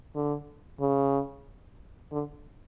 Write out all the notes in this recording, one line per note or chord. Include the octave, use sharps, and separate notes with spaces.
D3
C#3
D3